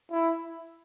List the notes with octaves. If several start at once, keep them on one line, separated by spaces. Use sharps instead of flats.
E4